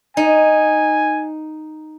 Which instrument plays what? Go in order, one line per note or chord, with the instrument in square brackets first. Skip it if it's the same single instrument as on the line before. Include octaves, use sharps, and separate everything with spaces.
[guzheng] D#4 [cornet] G#5